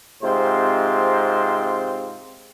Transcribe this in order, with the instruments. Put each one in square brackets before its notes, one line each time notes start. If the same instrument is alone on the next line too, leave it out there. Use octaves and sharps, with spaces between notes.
[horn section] G#2 C3 C4 F4 C5